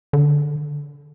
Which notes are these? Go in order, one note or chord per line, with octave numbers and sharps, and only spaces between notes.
D3